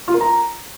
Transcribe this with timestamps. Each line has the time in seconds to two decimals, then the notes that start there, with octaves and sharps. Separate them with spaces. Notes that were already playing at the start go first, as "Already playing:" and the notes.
0.08 F4
0.14 A#4
0.21 A#5